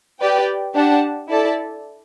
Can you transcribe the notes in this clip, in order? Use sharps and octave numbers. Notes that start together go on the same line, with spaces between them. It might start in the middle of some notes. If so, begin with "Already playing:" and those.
G4 B4 D5 G5
D4 G4 D5 F#5 A5
E4 A4 D5 A5